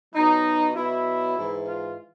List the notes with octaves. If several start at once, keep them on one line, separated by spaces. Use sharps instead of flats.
B2 F#3 D#4
B2 F#3 E4
G#2 E3
F4